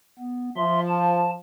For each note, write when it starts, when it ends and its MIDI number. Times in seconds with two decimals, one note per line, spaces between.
0.19 0.50 59
0.57 1.36 53
0.57 0.80 76
0.57 0.80 84
0.88 1.30 81